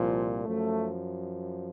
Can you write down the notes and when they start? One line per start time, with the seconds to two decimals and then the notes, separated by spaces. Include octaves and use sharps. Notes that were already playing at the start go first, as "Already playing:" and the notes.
Already playing: C2 A#2 F3
0.44 F#2 F3 A3